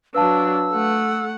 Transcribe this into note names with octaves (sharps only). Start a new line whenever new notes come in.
F#3 D4 B4 F5 A5 E6
A3 F#5